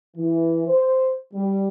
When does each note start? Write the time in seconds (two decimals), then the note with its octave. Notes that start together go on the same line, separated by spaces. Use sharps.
0.16 E3
0.67 C5
1.34 G3